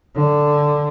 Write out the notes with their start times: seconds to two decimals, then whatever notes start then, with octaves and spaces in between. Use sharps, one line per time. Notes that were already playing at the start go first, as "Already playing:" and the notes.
0.15 D3